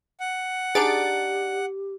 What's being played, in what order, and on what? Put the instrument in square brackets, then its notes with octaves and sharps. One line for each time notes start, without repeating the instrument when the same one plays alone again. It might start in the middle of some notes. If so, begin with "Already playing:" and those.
[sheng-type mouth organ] F#5
[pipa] D4 D#4 D5 [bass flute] G4 [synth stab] G#4 A6 D7